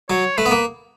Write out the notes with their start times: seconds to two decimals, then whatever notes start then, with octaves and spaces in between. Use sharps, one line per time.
0.10 F#3 C#5
0.37 A3 B4
0.46 B3
0.51 A#3